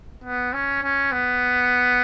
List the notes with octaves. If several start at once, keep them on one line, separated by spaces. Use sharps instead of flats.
B3
C#4
C#4
B3